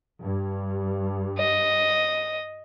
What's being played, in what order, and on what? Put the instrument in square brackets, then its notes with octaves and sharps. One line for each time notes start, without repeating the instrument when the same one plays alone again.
[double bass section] G2
[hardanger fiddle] D#5